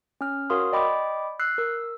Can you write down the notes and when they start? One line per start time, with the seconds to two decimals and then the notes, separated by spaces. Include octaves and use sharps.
0.21 C#4 F6
0.50 F#4 A#4 C#5 F5 C6 D#6
0.73 D5 D#5 G5 B5 D6
1.39 E6 F#6 C7
1.58 A#4 E6